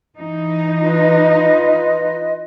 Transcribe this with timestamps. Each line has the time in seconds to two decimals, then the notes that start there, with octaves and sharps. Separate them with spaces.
0.17 E3 D#4
0.80 F4 B4 D#5